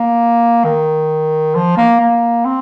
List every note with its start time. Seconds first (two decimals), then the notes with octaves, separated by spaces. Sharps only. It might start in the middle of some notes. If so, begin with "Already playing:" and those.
Already playing: A#3
0.65 D#3
1.55 F3
1.77 A#3
2.00 A#3
2.45 C4